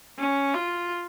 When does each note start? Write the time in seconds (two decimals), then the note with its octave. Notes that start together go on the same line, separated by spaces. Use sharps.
0.19 C#4
0.54 F4